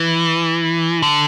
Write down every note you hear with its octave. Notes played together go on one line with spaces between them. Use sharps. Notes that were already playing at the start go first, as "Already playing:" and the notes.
Already playing: E3
D3